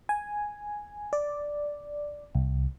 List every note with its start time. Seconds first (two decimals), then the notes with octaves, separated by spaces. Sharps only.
0.09 G#5
1.13 D5
2.35 C2